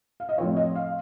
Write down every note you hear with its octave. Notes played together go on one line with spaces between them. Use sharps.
F5
D#5
A2 F3 C4 C#5
D#5
F5